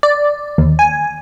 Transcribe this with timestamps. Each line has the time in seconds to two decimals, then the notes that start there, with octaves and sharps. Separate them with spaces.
0.03 D5
0.58 D#2
0.79 G#5